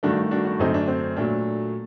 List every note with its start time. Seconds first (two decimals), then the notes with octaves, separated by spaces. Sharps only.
0.03 G2 D#3 A3 D4 F#4
0.31 D4 F#4
0.45 D4 F#4
0.59 F#2 D3 A3 C4 D#4
0.74 D4
0.88 C4
1.16 A#2 F#3 A3 D4